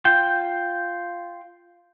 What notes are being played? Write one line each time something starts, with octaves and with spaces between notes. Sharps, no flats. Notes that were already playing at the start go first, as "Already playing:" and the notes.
F4 G5